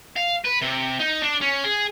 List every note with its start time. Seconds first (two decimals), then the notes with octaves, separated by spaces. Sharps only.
0.16 F5
0.45 B4
0.62 C3
1.00 D#4
1.23 D4
1.41 C#4
1.64 G#4